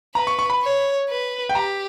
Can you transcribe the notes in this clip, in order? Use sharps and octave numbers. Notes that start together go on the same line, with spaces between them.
B4 A#5
C#6
C#6
B5
C#5
B4
G5
G4 A#5